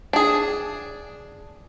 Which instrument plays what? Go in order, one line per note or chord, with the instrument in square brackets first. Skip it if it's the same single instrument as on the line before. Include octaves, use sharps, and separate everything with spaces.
[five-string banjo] D4 G#4